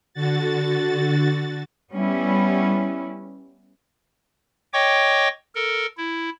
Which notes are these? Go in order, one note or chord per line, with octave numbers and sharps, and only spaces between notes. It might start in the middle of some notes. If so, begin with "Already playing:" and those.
D3 F#4 A6
G3 B3 C#4 E4
C#5 D#5 G5 C#6 D6
A4 A#4
E4